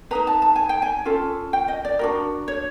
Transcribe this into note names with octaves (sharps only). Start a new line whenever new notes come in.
D#4 G#4 B4 A#5
A5
A5
G#5
G5
G#5
C#4 F4 A4
G5
D#5
D5
D4 F#4 A#4
C#5